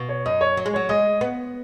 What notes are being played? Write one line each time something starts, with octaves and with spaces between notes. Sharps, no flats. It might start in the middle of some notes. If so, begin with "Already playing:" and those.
Already playing: B2
C#5
F#2 D#5
C#5
F#3
G#3
F#3 C#5
G#3 D#5
B3